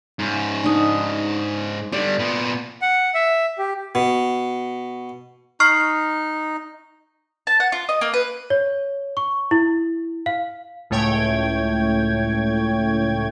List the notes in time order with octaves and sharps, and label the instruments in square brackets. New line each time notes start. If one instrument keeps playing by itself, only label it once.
[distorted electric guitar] G#2 C#4
[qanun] D4 D#4
[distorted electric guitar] D3 G3 [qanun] D5
[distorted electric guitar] A#2 B3
[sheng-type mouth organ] F#5
E5
G4
[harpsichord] B2
[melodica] D#4 [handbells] C#6 F6 C7
[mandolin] A5
F#5
F4
D#5
A#3
B4
[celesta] C#5
C#6
E4
F5
[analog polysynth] C#2 A2 A3 C#5 G5 G#6